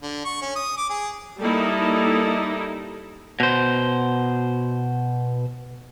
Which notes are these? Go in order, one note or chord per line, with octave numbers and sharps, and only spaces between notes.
D3
C#6
C#4
D#6
D6
G#4
G3 A#3 D#4 E4 A4
B2 C5